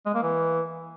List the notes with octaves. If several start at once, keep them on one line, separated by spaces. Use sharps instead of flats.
G#3
A#3
E3